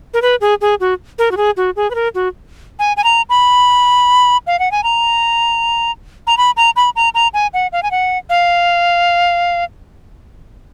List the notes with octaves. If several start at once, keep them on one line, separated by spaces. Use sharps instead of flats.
A#4
B4
G#4
G#4
F#4
A#4
F#4
G#4
F#4
G#4
B4
A#4
F#4
G#5
G#5
A#5
B5
F5
F#5
G#5
A#5
A#5
B5
A#5
B5
A#5
A#5
G#5
F#5
F5
G#5
F#5
F5